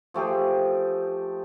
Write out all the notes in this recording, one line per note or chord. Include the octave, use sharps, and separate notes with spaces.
F3 A3 G4 G#4